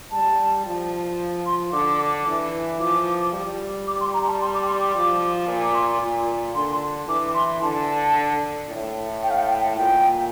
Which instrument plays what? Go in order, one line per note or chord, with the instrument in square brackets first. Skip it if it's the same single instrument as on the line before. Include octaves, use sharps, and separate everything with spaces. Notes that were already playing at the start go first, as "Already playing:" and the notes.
[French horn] G3 [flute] A5
[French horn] F3
[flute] C6
[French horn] D3 [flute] D6
[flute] D6
[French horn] E3
[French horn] F3 [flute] D6
[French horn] G3
[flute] D6
C6
A#5
A5
C6
D6
C6
D6
[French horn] F3
A#2
[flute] D6
C6
[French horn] A#2
[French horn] D3 [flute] C6
[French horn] E3 [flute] D6
[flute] C6
[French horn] D3 [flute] A5
[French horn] A2
[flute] G5
F5
G5
G5
[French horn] A#2 [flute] G5